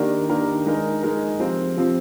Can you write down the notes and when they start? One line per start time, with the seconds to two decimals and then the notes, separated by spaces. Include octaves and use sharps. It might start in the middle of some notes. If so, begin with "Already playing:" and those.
Already playing: D#3 A#3 D4 G4 A#4
0.29 D#3 A#3 D4 G4 A#4
0.65 G#3 D#4 A#4
1.03 G#3 D#4 A#4
1.40 C3 F3 C4 F4
1.77 C3 F3 C4 F4